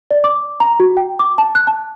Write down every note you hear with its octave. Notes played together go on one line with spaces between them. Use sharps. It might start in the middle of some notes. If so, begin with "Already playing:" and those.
D5
D6
A#5
F#4
G5
D6
A5
F#6
A5